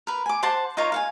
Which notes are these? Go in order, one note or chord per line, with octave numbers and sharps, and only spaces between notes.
A#4 B4
G#5 D6
C5 F#5 A5 C6
D#4 F4 A#4 C#5
F5 F#5 G#5